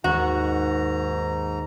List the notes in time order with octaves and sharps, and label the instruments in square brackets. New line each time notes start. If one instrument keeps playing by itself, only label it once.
[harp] D#2 [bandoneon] G#2 A#5 [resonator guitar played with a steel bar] F#4